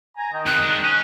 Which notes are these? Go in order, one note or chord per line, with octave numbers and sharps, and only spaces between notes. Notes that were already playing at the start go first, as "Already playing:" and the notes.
G#5 A#5
D#3 D#5 G5
F2 C3 F#6
G#3 D4
C#4